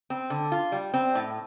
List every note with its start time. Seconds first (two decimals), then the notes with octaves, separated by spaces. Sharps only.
0.10 C4
0.30 D3
0.52 F4
0.72 G3
0.94 C4
1.15 A2